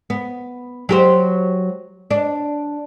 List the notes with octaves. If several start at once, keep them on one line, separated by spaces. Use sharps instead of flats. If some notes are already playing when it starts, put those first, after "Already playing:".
B3
F#3 G4 C5
D4